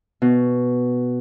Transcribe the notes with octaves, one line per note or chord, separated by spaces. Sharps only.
B2